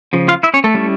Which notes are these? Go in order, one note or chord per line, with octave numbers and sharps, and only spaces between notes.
C#3 F3
F4 F5
E4 E5
C#4 C#5
A3 A4
G3 C#4 E4